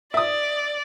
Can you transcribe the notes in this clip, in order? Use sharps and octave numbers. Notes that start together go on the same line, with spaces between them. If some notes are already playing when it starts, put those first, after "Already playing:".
D5 E5 D#6